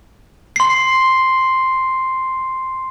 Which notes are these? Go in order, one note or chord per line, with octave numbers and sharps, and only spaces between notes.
C6 C7